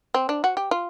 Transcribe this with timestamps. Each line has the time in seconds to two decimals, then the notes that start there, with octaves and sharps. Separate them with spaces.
0.14 C4
0.29 D4
0.44 F#4
0.57 G4
0.71 F4